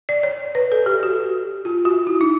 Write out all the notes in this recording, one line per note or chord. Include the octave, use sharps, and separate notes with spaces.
D5
C#5
B4
A4
G4
F#4
F4
F#4
E4
D#4